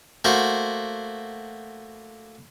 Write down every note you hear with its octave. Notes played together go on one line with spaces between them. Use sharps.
A3 A#3 F#4 C5